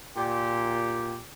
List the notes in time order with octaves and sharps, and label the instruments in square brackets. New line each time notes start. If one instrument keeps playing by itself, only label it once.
[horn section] A#2 G4